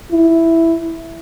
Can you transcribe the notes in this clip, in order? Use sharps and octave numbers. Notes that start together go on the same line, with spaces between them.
E4